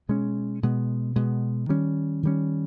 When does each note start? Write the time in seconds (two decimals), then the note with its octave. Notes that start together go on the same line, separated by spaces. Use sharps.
0.09 B2 G#3 C#4
0.63 B2 G#3 B3
1.16 B2 G#3 B3
1.69 D#3 G3 C#4
2.23 D#3 G3 C#4